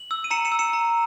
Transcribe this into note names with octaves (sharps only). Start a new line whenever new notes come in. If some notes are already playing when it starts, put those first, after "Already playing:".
Already playing: F#7
E6
D#7
A#5 C#7 E7
C#7 E7
E6
C#7 E7
A#5